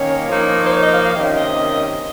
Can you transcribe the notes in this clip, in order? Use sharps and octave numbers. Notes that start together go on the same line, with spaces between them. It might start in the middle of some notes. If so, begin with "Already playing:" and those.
Already playing: D#3 A#3 C#4 C#5
F3 A#3 D#4
C5
C#5
D#5
F5
F5
C3 D#3 A#3 C#4 F5
D#5